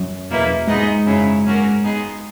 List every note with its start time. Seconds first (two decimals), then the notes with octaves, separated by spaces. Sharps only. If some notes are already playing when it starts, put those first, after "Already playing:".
Already playing: F#2
0.29 E2 B2 A#3 E4 B4
0.67 G#2 G#3 B3 D#4 G#4 D#5
1.05 F#2 C#3 F#3 C#4 E4
1.45 F#3 A#3 C#4 F#4 A#4
1.83 G#3 B3 D#4 G#4